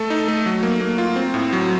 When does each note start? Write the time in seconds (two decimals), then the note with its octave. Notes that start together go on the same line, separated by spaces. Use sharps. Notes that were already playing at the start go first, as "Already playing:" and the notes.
Already playing: A3 A4
0.10 D#4
0.28 A3
0.46 F#3
0.63 A#3
0.81 A#3
0.98 F4
1.16 C4
1.34 A2
1.53 F#3